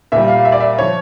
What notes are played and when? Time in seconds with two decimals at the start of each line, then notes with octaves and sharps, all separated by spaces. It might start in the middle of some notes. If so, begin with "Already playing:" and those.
0.12 A#2 G3 E5
0.28 F5
0.45 E5
0.52 D5
0.60 E5
0.79 F3 C#5